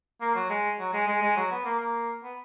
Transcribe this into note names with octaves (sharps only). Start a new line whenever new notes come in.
A#3
F#3
G#3
F#3
G#3
G#3
G#3
F#3
B3
A#3
A#3
B3